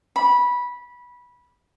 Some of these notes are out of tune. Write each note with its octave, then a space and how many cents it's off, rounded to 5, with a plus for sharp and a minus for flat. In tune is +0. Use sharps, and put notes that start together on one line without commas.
B5 -15